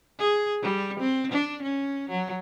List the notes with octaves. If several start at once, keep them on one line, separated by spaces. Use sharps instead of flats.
G#4
G3
C4
D4
C#4
F#3